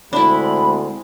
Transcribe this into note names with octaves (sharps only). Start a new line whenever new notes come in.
D2 G#3 C4 D4 E4 B5